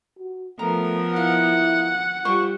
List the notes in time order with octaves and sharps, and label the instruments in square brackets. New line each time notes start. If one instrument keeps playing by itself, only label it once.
[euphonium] F#4
[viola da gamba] F3 B3 A#4 [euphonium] A3 [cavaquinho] A#5
[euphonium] E4 [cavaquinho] F5 [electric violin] F#5
[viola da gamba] G3 [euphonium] F4 [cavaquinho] C5 C#6